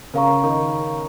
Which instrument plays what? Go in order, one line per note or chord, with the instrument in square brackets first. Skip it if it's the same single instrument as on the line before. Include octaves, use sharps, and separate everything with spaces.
[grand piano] C#3 C#4 [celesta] A#4 F5 A#5 C#6
[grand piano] D#3 D#4